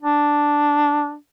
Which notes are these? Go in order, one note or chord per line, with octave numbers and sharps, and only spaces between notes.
D4